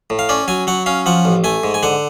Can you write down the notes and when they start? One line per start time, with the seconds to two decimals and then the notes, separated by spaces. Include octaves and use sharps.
0.10 A2
0.19 F5
0.29 C#4 D5
0.48 F#3 G#5
0.67 F#3 F#5
0.86 C#4 F5
1.06 F3 F#5
1.25 A1
1.44 A3 G#5
1.64 G#2
1.74 G#5
1.83 D3 F#5